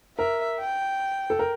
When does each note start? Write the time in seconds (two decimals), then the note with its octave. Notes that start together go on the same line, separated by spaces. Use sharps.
0.18 A#4 E5
0.59 G5
1.30 A4
1.39 A#4